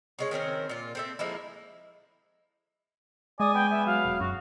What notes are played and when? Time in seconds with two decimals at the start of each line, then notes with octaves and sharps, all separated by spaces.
0.19 C#3 G#3 C#5
0.31 D#3 C4 C#4 A#4
0.69 A#2 F4
0.95 C4 A4 E5
1.19 F3 G#3 A#3 E4
3.40 G#3 D5 G#5 D#6
3.54 B3 G5
3.71 B3 E5
3.86 F#3 F5
4.05 E1
4.20 F#2 F#4